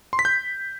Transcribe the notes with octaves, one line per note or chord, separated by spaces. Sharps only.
C6
B6
G6